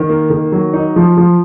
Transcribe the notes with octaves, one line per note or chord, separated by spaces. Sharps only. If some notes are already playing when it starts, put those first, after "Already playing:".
Already playing: D#3
A#3
D#3
F#3
D#4
F3
F3